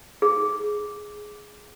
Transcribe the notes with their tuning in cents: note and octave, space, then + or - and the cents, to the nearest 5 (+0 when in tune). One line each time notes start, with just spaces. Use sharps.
G#4 +5